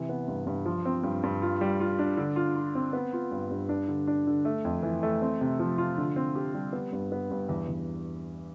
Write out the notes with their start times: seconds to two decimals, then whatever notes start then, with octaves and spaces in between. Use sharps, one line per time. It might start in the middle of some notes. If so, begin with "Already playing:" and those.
Already playing: C3 E3
0.09 B3
0.28 G2
0.47 G2
0.65 F3
0.85 C4
1.03 G2
1.23 G2
1.42 F4
1.61 G3
1.80 F4
1.99 D4
2.17 D3
2.36 F4
2.56 F4
2.75 C4
2.93 B3
3.13 F4
3.31 G2
3.51 G2
3.69 D4
3.88 D3
4.07 D4
4.27 D3
4.45 A3
4.65 F2
4.83 E3
5.03 A3
5.22 C4
5.41 C3
5.59 F3
5.78 F4
5.98 D3
6.16 C4
6.35 G4
6.54 G3
6.73 B3
6.92 G2
7.12 B3
7.31 G2
7.49 E2
7.68 E2